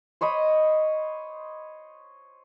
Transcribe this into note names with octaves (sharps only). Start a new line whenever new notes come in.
C5 C#5 D#5 B5